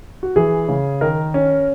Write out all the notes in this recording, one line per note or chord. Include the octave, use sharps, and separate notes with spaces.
F#4
E3 G#4
C#3
D#3 A#4
C#4